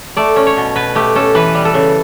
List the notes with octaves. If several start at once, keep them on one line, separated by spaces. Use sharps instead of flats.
A3 D5
C#4
C#5
B2
B2 B4
A3 G4
C#4 A4
E3 B4
G3
A4
C#3